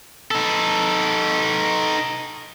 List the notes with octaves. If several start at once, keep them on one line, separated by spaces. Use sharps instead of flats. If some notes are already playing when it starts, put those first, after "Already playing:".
D#4 A4